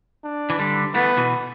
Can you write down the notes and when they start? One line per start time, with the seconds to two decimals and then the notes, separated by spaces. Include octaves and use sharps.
0.24 D4
0.50 E3
0.59 D3 G3
0.94 E3 A3 B3
1.17 B2 E3